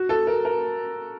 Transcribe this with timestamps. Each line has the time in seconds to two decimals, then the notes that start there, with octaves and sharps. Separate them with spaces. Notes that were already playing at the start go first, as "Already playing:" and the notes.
Already playing: F#4
0.09 A4
0.27 A#4
0.45 A#4